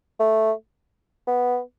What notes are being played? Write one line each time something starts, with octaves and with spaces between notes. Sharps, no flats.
A3
B3